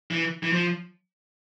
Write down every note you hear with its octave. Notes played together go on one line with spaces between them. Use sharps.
E3
E3
F3